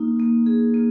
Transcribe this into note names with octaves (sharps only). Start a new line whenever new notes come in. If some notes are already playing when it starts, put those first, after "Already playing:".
Already playing: A#3 D#4
A#3
G#4
A#3